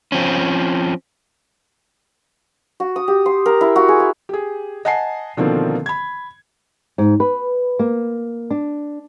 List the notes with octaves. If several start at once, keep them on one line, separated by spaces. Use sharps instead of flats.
F3 C4 C#4
F#4
D#6
G4
C6
A#4
E4
F#4
G#4
G#5
G4 G#4
D#5 F#5 G#5 A5 C7
B2 D3 D#3 F3 A#3 C4
B5 G#6
G#2
B4
A#3
D4